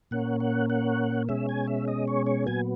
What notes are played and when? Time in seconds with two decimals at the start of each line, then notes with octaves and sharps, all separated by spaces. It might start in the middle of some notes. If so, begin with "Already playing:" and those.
0.11 A#2 A#3 C#4 F#5
0.40 F#5
0.70 F#5
1.29 B2 G#3 C#4 E5
1.49 G#5
1.67 E5
1.88 D#5
2.08 C#5
2.27 C#5
2.46 A#2 F#3 B3 G#5